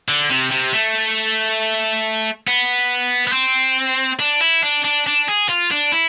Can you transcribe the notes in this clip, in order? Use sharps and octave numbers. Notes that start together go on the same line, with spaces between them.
D3
C3
C3
A3
B3
B3
C4
D4
E4
D4
D4
D4
G#4
F4
D4
E4